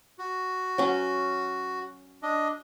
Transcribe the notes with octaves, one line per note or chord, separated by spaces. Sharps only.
F#4
F#3 C#4 C#5 F#5
D4 D#5